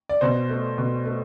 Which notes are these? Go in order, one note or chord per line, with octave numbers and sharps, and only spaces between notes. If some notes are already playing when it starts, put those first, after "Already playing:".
D5
B2 C5
A3
B2
A3